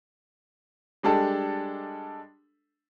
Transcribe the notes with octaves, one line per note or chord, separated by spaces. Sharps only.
G3 G#3 D4 G4 A4